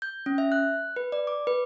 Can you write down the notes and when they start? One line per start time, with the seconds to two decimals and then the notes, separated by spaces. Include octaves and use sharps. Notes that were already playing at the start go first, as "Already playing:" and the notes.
0.02 G6
0.26 C#4
0.38 E5
0.52 F#6
0.96 B4
1.12 D5
1.27 D6
1.47 B4